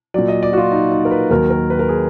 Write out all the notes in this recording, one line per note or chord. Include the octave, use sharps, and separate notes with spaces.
A#2 F#3 D5
D#5
D5
F#4
F4
D#4
D#4
A#4
B4
D#2 D#3 F#3 A#4
A#4
B4
A#4
G#4